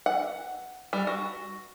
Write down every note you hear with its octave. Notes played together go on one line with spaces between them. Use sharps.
F#5
G3
F#4